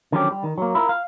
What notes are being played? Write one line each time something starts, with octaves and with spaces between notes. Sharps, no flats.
D3 D#3 F3 F#3 C#4 G4
G3
D#3
F#3 A#3
E4 F4 A#4
F5